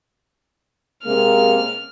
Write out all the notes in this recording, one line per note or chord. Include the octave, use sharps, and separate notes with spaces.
C3 G#3 A#3 F6